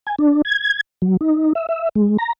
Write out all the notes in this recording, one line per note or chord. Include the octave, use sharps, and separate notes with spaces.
G#5
D4
G#6
F#3
D#4
E5
E5
G#3
A#5